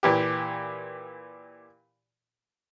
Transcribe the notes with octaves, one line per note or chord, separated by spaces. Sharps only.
A#2 E3 G4